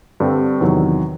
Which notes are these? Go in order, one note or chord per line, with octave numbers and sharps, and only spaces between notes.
G2 D3 G3 C4
E2 C3 D#3 F#3